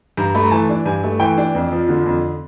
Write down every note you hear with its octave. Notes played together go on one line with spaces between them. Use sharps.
G2 A#5
A3 B5
A#5
E3 A5
D4
G2 G#5
A3
E3 G5
D4
F2
F3
D3
F2